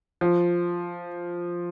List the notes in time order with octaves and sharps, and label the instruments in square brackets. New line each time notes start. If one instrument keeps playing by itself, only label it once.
[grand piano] F3